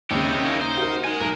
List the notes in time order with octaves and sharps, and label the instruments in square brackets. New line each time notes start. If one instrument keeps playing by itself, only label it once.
[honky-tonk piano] D#2 C#3 [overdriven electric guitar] C4 G4 [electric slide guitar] D#4 E4 C#5
[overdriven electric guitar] A#3 C#4
[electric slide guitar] D#4 [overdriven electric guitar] C5
[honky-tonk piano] F#4 A#4
[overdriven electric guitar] G#5 C6
[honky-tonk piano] B1 [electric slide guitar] A#4